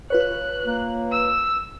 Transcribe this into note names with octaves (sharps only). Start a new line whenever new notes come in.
F4 B4 C#5 F#6
A#3
E6